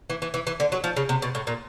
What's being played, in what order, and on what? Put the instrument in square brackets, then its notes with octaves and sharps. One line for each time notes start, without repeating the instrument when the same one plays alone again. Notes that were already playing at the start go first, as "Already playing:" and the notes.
[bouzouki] E3
E3
E3
E3
D3
F#3
F3
C#3
C3
B2
A2
A#2